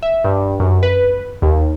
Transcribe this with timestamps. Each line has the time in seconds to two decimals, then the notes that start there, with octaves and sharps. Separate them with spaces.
0.03 E5
0.24 G2
0.60 F#2
0.83 B4
1.42 D#2